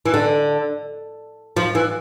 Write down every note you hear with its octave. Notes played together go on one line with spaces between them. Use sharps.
E3
D3
F3
E3